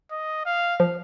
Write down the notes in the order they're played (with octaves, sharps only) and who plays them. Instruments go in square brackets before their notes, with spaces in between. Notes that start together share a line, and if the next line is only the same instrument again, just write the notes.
[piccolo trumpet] D#5
F5
[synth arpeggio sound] F3